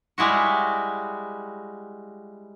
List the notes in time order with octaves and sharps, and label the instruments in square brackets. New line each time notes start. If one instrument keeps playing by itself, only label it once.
[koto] G3 G#3 E4 F#4